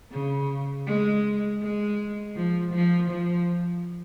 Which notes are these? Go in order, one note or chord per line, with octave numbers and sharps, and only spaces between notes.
C#3
G#3
G#3
F3
F3
F3